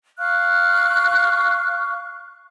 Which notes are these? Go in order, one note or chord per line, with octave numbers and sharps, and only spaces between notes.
F5 C#6 F6 F#6